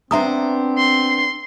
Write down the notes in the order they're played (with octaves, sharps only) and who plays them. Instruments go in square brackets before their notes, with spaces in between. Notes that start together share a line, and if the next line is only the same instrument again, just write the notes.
[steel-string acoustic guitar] B3 D4 C5 [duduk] C4 [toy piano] E5 A#5 D#6
[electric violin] C6